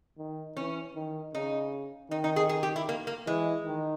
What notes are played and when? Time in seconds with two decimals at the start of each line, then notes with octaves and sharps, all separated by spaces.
0.18 D#3
0.57 E3 C#4
0.95 D#3
1.34 C#3 D#4
2.11 D#3 D#4
2.24 D#4
2.36 G#4
2.49 G#4
2.63 G4
2.76 E4
2.89 A#3
3.07 A#3
3.27 E3 G#3
3.66 D#3